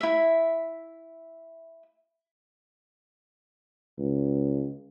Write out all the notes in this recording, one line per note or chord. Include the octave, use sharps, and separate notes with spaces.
E4 E5
C#2